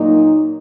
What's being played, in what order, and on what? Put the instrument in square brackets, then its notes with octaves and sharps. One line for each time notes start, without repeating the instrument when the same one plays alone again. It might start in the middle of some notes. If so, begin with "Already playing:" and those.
Already playing: [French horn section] A#2 F#3 A#3 D#4